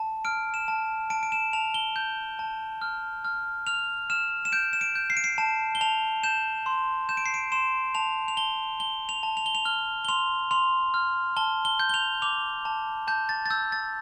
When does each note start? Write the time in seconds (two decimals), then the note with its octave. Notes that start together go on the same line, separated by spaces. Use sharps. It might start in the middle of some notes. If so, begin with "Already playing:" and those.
Already playing: A5
0.25 F6 D7
0.54 E7
0.68 A5
1.10 A5 D7
1.23 D7
1.32 E7
1.53 A5 F7
1.74 G7
1.96 G6
2.39 A5
2.82 F6
3.25 F6
3.67 F6 F7
4.10 F6 E7
4.45 E7
4.52 G6 D7
4.73 E7
4.81 D7
4.95 G6
5.10 C7
5.17 D7
5.24 C7
5.38 A5 E7
5.75 G7
5.81 A5 F7
6.23 G6 E7
6.66 C6
7.09 G6 E7
7.17 D7
7.26 C7
7.34 D7
7.52 C6 E7
7.95 A5 F7
8.28 F7
8.37 A5 G7
8.80 A5 G7
9.09 F7
9.23 A5
9.37 F7
9.46 G7
9.55 F7
9.65 F6 G7
10.05 G7
10.09 C6 F7
10.51 C6 F7
10.94 F6
11.37 A5 G7
11.65 G7
11.80 G6
11.89 G7
11.94 F7
12.22 D6 F7
12.65 A5
13.07 A5 G6
13.29 A6
13.46 A6
13.50 E6 G6
13.72 A6